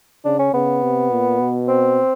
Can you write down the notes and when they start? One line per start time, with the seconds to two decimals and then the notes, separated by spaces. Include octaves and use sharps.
0.25 C#3 D4
0.39 C#4
0.53 C#3 B3
0.82 C3
1.11 A#2
1.40 B2
1.68 C4